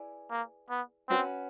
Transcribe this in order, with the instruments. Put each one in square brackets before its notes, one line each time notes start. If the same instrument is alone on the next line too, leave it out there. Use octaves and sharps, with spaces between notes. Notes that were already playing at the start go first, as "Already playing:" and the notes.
Already playing: [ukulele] E4 G#4 B4 D5
[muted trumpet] A#3
B3
[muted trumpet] C4 [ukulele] C#4 F#4 B4